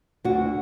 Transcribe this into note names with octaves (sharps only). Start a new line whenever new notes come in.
D2 D4 F#4